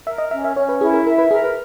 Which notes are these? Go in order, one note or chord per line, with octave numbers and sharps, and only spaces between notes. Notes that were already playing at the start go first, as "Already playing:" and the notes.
A#4 E5
D#5
C#4 E5
E5
C#4 C#5
B4
E4 G#4
A#4
A#4 E5
B4
G#4 A#4
B4